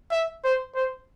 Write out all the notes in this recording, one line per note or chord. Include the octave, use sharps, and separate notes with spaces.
E5
C5
C5